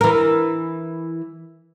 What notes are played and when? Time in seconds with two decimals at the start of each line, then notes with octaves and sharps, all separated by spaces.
0.01 E3 A#4